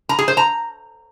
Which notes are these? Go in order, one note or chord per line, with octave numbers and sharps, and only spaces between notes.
A#5
G#4
C5
A#5